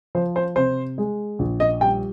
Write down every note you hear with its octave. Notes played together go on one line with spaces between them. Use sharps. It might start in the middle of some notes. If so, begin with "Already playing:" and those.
F3 C5
C5
C3 C5
G#3
A#1
D#5
G3 G5